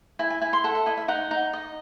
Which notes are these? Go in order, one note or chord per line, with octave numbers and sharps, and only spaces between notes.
E4 G#5
G#5
E4 G#5
C6
A4 F#5
E5
E4 D#5
E5
D#4 F#5
D#4
D#5